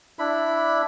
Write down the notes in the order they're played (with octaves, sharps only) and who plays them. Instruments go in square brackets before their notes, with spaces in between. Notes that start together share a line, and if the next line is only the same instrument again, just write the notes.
[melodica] D4 E4 B5